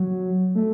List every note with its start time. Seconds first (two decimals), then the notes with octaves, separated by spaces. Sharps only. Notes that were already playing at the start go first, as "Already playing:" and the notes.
Already playing: F#3
0.55 A3